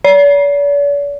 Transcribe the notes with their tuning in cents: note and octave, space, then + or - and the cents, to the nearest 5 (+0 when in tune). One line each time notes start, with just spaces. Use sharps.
D5 -45